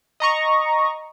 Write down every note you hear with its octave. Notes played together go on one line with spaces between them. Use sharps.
D#5 A#5 C#6